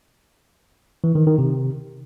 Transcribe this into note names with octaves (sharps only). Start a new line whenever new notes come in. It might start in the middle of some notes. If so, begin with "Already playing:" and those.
E3
D#3
D#3
C3